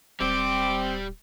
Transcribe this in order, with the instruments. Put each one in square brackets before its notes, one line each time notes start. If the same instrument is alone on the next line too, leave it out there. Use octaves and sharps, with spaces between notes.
[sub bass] D1 [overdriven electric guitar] G3 G4 [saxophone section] C4 [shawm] D6